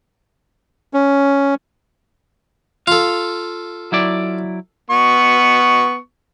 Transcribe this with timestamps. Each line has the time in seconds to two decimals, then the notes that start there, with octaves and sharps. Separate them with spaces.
0.94 C#4
2.87 F4 A4 F5
3.92 F#3 E4 D5
4.91 B3 C#6